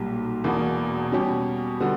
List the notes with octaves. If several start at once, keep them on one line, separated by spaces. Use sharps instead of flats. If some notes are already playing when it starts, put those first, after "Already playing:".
Already playing: B1 A#2 G3
E1 E2 B2 A#3
B2 G3 C#4 G4
D3 G3 B3 F#4